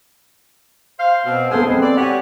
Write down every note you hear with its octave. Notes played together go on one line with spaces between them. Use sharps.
C5 F5
B2 C4
B3 G#4 A4 C5 F5
G#3 C4 B4
D5
F#4 G4 C#5 F#5 G#5